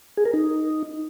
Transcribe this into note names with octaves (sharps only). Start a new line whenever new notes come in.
G#4
A#4
D#4